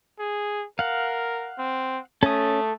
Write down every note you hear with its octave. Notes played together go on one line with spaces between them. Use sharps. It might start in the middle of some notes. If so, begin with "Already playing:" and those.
G#4
A#4 F5 F#5
C4
A3 C#4 A4 D#6